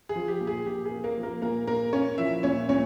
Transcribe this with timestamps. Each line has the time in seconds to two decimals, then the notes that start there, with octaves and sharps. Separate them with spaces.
0.09 G#4
0.16 F3
0.28 G4
0.41 A#2
0.47 G#4
0.66 A#2 G4
0.85 G#4
0.91 A#3
1.04 A#3 A#4
1.17 F3
1.23 A#3 A#4
1.42 A#2 A#3 A#4
1.67 A#2 A#3 A#4
1.93 A#3 C#4 C#5
2.18 F3 E4 E5
2.43 A#2 C#4 C#5
2.69 A#2 C#4 C#5